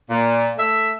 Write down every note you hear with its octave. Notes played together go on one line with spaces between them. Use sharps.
A#2
A3 E5